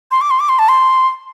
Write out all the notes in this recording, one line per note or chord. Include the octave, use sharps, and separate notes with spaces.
C6
D6
C6
D6
C6
A5
C6